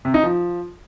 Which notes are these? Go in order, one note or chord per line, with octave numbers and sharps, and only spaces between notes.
C3
D#4
F3